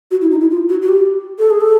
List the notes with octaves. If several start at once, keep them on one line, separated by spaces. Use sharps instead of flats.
F#4
E4
D#4
E4
F4
F#4
F#4
G4
A4
G#4
A4